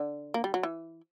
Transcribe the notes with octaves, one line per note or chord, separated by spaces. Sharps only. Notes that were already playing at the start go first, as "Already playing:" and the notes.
Already playing: D3
A#3
G3
F#3
E3